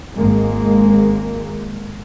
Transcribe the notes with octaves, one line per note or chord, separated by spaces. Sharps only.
G#1 G#3 A#3